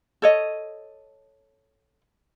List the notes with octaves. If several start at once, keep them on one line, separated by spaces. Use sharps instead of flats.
A4 C#5 D#5